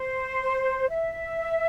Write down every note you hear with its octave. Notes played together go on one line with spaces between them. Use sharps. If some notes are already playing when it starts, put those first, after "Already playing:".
Already playing: C5
E5